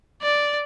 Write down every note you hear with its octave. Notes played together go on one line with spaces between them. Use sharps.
D5